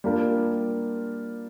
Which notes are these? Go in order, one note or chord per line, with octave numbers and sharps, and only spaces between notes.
G3 A#3 D4 F4 A#4